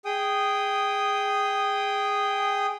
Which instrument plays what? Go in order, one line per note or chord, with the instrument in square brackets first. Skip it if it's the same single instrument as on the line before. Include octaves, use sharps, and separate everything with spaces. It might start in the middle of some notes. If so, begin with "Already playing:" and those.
[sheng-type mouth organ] G#4 G5 D#6